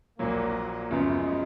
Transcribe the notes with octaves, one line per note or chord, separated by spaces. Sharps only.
A#1 A#2 F#3 A#3
F#2 C#3 F3 G#3 B3